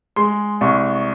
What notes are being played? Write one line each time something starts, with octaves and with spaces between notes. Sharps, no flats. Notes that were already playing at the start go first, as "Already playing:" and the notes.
G#3 C6
C2 C#6